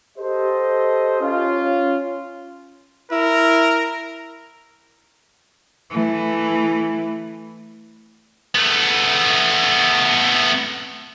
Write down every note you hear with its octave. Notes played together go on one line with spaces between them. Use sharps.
G4 A4 C5 D#5
C#4 F4
E4 A#4
E3 A3
A3 B3